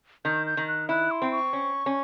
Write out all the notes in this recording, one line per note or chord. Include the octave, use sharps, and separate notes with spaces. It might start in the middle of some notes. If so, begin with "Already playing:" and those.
D#3 G6
G6
D#3
F#6
E4 F#6
C6
C4
C#6
C#4
C#4